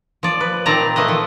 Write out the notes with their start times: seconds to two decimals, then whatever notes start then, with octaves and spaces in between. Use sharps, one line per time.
0.23 F3 D5
0.41 B4
0.66 A#2 D#3 C4 D5 A5 A#5
0.96 A3 A#3 B4 D#5
1.08 F3